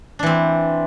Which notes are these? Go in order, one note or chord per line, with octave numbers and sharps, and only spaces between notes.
E3 C4 D4